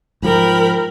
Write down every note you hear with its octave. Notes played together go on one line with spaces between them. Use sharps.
G#2 F3 A#4 G5 B5